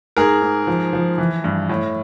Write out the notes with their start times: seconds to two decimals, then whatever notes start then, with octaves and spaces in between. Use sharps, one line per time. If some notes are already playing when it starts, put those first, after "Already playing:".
0.17 G#2 G#4 A#4
0.42 G#2
0.67 F3
0.93 F3
1.18 E3
1.44 G2
1.69 A2